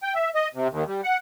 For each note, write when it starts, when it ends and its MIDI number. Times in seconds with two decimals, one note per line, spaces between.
0.03 0.14 79
0.15 0.30 76
0.35 0.48 75
0.54 0.68 48
0.70 0.84 39
0.87 1.01 55
1.04 1.17 78